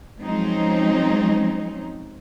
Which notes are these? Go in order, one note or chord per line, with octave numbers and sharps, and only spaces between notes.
F3 F#3 G#3 C4 C#4 D#4